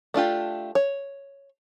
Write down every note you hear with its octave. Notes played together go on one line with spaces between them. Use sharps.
A3 D4 F4 G4
C#5